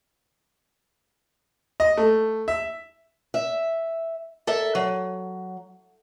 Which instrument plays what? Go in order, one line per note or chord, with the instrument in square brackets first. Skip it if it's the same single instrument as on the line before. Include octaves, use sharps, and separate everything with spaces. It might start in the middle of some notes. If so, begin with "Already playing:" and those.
[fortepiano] D#5
A3
E5
[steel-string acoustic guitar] E5
A4 A#4 E5
F#3